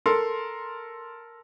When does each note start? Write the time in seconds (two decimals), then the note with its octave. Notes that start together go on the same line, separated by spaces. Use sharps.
0.06 A4 A#4 C6